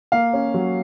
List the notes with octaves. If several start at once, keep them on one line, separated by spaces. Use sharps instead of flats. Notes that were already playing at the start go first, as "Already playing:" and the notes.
A#3 F5
C#4
F#3